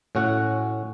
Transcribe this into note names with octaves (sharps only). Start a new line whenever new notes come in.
A2 C#4 F#4 F#5